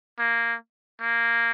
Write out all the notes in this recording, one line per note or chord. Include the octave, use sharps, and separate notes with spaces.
A#3
A#3